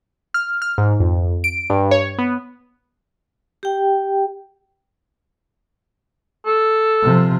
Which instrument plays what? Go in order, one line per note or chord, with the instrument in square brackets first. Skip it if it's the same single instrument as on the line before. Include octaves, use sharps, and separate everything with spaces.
[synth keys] F6
F6
G#2
F2
D7
G2
C#5
B3
[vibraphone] G4 G5
[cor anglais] A4
[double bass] C3 F3